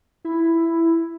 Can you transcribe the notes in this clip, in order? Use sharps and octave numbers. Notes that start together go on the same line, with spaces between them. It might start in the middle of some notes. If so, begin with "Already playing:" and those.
E4